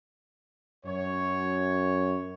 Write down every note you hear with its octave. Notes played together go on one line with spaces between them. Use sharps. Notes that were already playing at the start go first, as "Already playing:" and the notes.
F#2 C#5